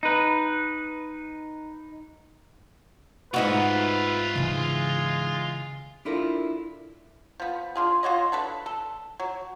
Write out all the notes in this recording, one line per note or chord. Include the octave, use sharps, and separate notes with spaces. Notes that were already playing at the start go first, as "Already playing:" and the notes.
D#4 B4
G#2 D#4 F4 F#4 B4 E5
C#3 E3 G#3
D4 E4 F4 A4 A#4
F3 B3
D4 F4 G#4
F4 F#4 C#5 D#5
D4 A4 B4
A4
F#3